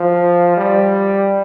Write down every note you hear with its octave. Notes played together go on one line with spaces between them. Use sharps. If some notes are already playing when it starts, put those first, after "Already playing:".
Already playing: F3
G3